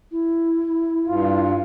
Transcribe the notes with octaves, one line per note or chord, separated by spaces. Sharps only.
E4
G2 F4